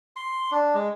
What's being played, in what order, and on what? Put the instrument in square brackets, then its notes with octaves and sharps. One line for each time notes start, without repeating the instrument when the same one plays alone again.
[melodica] C6
D4
G#3